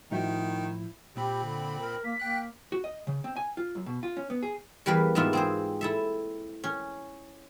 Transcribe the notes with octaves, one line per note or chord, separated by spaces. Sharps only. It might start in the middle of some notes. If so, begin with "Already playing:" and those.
A2 D#3 F3 D#4 E4 F#4 E5 G6
A#2 C4 G4 B5
D3
A#4
A#3 B6
A#3 G5 F#6
F#4
D#5
C#3
C4
G#5
F4
F#2
B2
F4
C#4
B3
G#4
E2 G3 A#4 B4 F5 B5
G#2 A#3 B3 F4 E5
C4 G#4 C5
E4 A4 E5
C#4